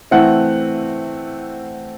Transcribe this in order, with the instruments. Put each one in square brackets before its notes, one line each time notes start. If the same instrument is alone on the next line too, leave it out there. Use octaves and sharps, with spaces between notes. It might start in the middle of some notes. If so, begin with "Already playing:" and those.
[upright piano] E3 A3 C4 F#5